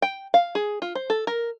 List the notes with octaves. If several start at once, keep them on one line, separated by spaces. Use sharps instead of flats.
G5
F5
G#4
F4
C5
A4
A#4